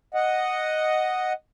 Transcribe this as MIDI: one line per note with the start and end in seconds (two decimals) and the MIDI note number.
0.14 1.33 75
0.14 1.33 78